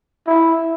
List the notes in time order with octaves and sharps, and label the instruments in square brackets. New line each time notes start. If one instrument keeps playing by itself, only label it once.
[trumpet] E4